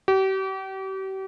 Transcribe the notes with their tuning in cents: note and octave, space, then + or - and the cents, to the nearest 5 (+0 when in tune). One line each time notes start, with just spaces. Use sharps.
G4 -40